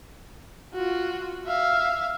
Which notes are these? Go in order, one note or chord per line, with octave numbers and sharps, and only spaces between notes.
F4 F#4
E5 F5